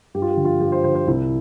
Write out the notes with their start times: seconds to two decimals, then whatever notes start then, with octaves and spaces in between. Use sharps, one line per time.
0.14 G2 G4
0.22 F4
0.30 G4
0.37 D3 F3
0.45 F4
0.61 G2 G4
0.72 C5
0.84 D3 F3 C5
0.95 C5
1.07 C2 E4